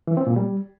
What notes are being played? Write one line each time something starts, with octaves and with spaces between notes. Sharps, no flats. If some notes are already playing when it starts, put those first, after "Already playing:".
E3
C4
A#2
G3